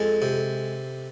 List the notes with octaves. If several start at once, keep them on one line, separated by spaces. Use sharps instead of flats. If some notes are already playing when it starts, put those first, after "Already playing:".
Already playing: F2 G#3 A4
C3